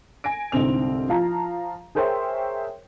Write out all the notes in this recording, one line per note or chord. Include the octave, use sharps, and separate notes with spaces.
G#5 A#6 D7
C2 G#2 D3 C4 F7
F3 F4 F5 A5 A#5
G#4 A#4 C5 C#5 E5 G5